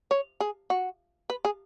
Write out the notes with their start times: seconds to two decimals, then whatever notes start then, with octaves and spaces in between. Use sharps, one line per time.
0.11 C#5
0.40 G#4
0.70 F#4
1.30 B4
1.45 G#4